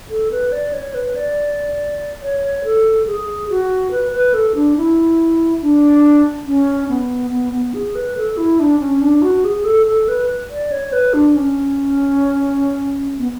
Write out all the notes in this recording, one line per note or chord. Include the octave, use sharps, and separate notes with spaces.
A4
B4
D5
C#5
B4
D5
C#5
A4
G#4
F#4
B4
B4
A4
D4
E4
D4
C#4
B3
B3
B3
G#4
B4
A4
E4
D4
C#4
D4
F#4
G#4
A4
A4
B4
D5
C#5
B4
D4
C#4
B3